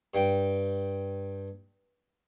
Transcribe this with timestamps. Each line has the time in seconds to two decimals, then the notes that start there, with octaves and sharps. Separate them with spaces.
0.14 G2 G5